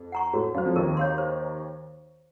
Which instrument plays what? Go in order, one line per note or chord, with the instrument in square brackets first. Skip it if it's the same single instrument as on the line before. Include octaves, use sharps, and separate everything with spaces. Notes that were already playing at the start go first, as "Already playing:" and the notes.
Already playing: [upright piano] F2
[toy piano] F#5 A#5 C#6
[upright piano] A2 A3 [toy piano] F#4
[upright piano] F#2 F#3 [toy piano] C5 F5
[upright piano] F2 F3
[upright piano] D#2 D#3 [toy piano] A#4
[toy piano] C#5 F5 C6
C5